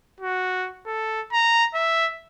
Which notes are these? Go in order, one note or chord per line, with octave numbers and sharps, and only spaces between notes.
F#4
A4
A#5
E5